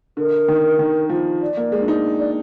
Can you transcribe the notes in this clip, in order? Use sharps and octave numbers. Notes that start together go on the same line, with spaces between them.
D3 A#4
D#3
D#3
F3
D5
A#3
G#3
D4
D#4
D5